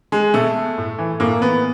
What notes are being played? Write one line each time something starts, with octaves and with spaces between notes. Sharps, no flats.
G#3
B2 A3
A2
E3
A2 A#3
E3 B3